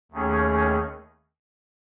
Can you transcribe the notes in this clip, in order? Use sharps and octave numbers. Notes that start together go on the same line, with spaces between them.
D#2 D#3 A3 C#4 G#4